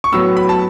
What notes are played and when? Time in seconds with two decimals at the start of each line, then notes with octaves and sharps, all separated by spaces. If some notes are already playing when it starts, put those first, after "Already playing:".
0.04 C#6
0.12 A2 F#3 B3 E6
0.37 B5
0.49 A5